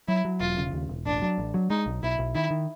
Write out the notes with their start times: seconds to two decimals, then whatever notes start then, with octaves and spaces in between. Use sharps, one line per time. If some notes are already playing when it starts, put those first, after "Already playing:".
0.08 F#3 E4
0.25 F#3
0.40 E1 F4
0.57 C#3
0.73 D#2
0.89 E1
1.05 A1 D4
1.22 F#3
1.38 A1
1.54 F#3
1.70 G#3 D#4
1.86 B1
2.03 B1 E4
2.19 B1
2.35 D#3 E4
2.51 D#3